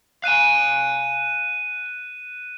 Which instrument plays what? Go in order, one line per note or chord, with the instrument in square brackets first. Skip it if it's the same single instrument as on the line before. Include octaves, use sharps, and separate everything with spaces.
[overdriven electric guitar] F5 G#5 [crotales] F#6 D#7 E7